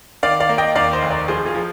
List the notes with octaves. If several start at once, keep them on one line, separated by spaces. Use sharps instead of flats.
D#3 D5 F5
D5 F5
A#3
D#5 G5
D#2 D5 F5
C5 D#5
F1
A#4 D5
F3 G#4 C5
F4 G#4
F3